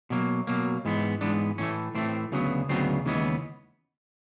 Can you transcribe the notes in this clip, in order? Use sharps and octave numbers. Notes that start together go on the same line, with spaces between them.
B2 F#3 A#3
B2 F#3 A#3
G#2 E3 G#3 B3
G#2 E3 G#3 B3 D4
A2 E3 A3 C#4
A2 E3 A3 C4
D2 C#3 F#3 B3
D2 C#3 F#3 B3 C4
D#2 C#3 E3 G#3 B3